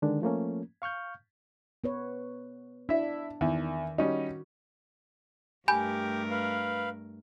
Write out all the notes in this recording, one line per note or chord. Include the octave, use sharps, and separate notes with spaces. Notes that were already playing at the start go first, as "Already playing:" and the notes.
D3 D#3 G#3 D4
F3 A3 A#3 C#4
F5 C#6 F6 G6
B3 B4 C#5
D4 E4 E5
E2 D#3
G3 C#4 D#4 F#4
G2 A3 G4 A#4 G#5 B5 G6
B4 F5